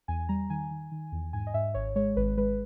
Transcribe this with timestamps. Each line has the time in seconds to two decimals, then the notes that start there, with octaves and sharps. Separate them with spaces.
0.08 E2 G#5
0.29 G3 A#5
0.50 D#3 G#5
0.71 D#3
0.92 D#3
1.12 E2
1.33 G#2 G#5
1.47 D#5
1.54 G#2 E5
1.74 G#1 C#5
1.96 G#3 C#5
2.17 G#1 B4
2.37 G#3 B4